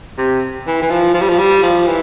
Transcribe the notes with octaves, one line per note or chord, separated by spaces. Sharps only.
C3
E3
E3
F3
F3
G3
F3
G3
F3
E3